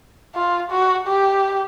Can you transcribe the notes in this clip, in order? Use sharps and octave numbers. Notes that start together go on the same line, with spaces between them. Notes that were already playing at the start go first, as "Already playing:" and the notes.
F4
F#4
G4